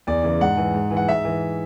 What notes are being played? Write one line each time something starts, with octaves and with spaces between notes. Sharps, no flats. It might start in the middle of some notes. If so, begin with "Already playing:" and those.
E2 D5
C#3 E3
G#2 F#5
E3
G#2
E3
F#5
G#2 E5
E3